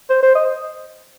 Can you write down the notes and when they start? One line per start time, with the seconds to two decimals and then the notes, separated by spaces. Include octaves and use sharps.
0.10 C5
0.23 C5
0.35 D#5